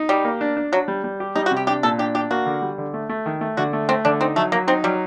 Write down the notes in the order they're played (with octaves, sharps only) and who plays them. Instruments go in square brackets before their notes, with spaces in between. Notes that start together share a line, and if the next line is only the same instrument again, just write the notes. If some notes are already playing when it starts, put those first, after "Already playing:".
Already playing: [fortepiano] D#4
[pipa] G3 [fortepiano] G4
[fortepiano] A#3
D4
D4
[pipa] F#3 [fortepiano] D4
[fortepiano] G3
G3
G4
[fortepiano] G3 [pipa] D#4
[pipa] F#4
[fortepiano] C3
[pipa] G4
[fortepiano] D4 [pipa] G4
[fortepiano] A#2 [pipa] A4
[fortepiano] D4 [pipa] G4
[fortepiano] D4 [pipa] G4
[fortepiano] A#3 [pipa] F#4
[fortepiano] D3
G3
D3
A3
A3
D#3
A3
[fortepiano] D3 [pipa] F#4
[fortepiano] A3
[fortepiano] A3 [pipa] C4
[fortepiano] D3 [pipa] D4
[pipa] C4 [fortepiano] D#4
[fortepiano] F#3 [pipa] A3
[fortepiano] F#3 [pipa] A#3
[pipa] C4 [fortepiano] D#4
[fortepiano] F#3 [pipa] G3